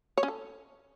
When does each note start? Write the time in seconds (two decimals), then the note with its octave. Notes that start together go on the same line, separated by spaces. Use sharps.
0.18 C#5
0.23 C#4
0.28 A4